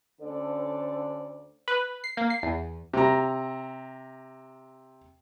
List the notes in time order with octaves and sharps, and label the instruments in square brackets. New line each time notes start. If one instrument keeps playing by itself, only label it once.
[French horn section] D2 D3 C#4 A4 C5 D5
[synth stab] B4
C7
A#3
C7
E2
[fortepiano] C3 A#5